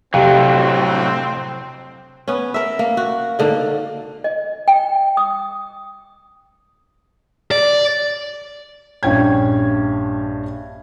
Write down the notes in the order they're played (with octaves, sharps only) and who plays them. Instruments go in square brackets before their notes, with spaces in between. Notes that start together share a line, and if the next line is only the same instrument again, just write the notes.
[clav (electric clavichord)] F2 [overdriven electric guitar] A2 F#3 [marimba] C3 G4 [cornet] C4
[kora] B3 C#4
A#4 E5
A#3
F#4
G#2 D3 A#3
[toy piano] D#5
G5
D#6
[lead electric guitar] D5
[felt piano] A#1 G2 C#4 G5 G#6